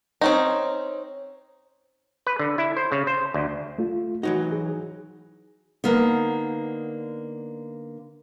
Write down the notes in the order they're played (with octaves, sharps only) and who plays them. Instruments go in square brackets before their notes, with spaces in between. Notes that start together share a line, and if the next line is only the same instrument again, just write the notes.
[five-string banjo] C4 C#4 D#4
[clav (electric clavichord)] B4
D3
E4
C5
C#3
C5
D2
[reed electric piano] A3 F4
[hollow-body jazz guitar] E3 F#3 D#4 [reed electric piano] F#4
[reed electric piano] G#4
[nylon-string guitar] D3 A#3 B3 D#4